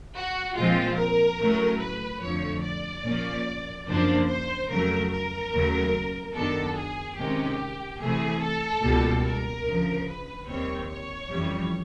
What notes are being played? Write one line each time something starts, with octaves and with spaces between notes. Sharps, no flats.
F#4
A#2 F3 G#3 C4 F4
A#4
A2 F#3 A3 C#4
B4
F2 D3 F3 A3 C#5
D5
A#2 F3 A#3 C#4
F#2 C#3 F3 A#3 D4 C5
C5
F2 C#3 F#3 A3 A#4
A#4
D#2 C#3 F#3 A3
F#2 D#3 F#3 B3 D4 A4
G#4
C3 D#3 G#3 C#4 G4
C3 E3 A3 G#4
A4
C#2 B2 G3 A#3
A#4
D2 C#3 F3
B4
D#2 D#3 G3 C4 C#5
C#5
F2 C#3 E3 G3